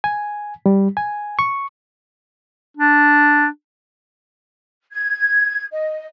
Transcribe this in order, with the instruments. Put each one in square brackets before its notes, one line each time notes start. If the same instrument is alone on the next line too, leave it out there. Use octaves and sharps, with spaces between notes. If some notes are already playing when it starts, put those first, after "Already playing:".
[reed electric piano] G#5
G3
G#5
C#6
[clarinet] D4
[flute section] G#6
D#5